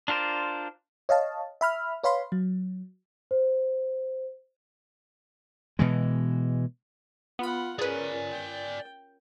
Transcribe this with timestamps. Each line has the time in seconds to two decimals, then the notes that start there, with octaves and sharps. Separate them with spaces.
0.08 D4 F4 A#4 C5 D5
1.09 C#5 D#5 F5 A5
1.61 E5 B5 F6
2.04 B4 C#5 F5 B5 C6
2.32 F#3
3.31 C5
5.79 B2 E3 G#3
7.39 B3 F4 F#5 B5
7.79 C#4 G#4 A#4 B4 D5 G#5
8.31 G5